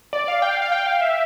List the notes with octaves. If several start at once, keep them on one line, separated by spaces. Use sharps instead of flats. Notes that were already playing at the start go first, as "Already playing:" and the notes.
D5
F5
G5
F5
F5
G5
F5
E5